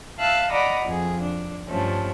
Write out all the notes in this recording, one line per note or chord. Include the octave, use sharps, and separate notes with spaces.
E5 F5 A5 E6 F#6
D5 D#5 F#5 A#5 B5 D6
F2 G#4
D4
G2 F3 A3 C#4